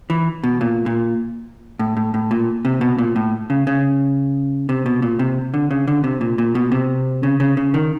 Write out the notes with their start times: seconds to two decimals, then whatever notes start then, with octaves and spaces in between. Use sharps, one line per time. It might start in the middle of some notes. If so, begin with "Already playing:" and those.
0.10 E3
0.44 B2
0.61 A#2
0.86 A#2
1.79 A2
1.97 A2
2.14 A2
2.31 A#2
2.65 C3
2.81 B2
2.98 A#2
3.16 A2
3.50 C#3
3.67 C#3
4.69 C3
4.86 B2
5.02 A#2
5.19 C3
5.54 D3
5.71 C#3
5.88 D3
6.04 C3
6.21 A#2
6.38 A#2
6.55 B2
6.72 C3
7.23 C#3
7.40 C#3
7.57 C#3
7.74 D#3